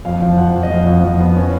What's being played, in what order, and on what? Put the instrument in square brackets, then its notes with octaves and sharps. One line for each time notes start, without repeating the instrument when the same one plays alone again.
[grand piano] F2 F5
F3
F2 F#5
F2
D#5
F2 F5
F2
F2
B3
C#4